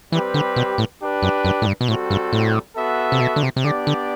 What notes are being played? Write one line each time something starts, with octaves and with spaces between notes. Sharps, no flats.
E3 G3 C4 G4 B4
D3
B2
A2
D4 G4 B4
F#2
F#2
A2
G2
B2
A2 G3 C4 F#4 A4
G2
A2
B3 F#4 A4 E5
C3
B2
D3
C3
C3
D3 B3 D4 G4 D5
D3